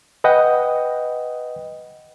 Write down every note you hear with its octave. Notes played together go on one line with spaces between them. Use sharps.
B4 D#5 F#5 G5